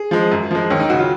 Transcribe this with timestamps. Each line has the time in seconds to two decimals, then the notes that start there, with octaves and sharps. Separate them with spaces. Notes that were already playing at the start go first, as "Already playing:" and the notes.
Already playing: G#4
0.11 F3 G#3
0.32 F#2
0.51 F3 G#3
0.70 D#2 C#4
0.80 D#4
0.90 C#3 F#3 F#4
0.99 F4